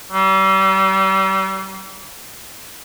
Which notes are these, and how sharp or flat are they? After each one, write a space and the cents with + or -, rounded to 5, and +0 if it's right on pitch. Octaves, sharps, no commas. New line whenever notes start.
G3 -40